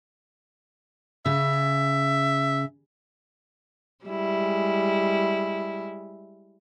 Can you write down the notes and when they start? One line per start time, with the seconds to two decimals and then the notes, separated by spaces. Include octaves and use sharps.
1.26 C#3 E5
4.05 G3 G#3 E4